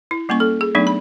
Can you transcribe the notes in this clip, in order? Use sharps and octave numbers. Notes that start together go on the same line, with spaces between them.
E4
G3 A#3 C#4 C#6
A4
G#4
F#3 A3 B3 D4 D#4
B5